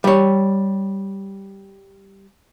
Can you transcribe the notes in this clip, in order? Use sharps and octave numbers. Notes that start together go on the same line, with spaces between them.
G3 C#5